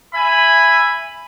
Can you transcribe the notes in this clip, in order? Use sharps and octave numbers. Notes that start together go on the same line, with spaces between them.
E5 G#5 B5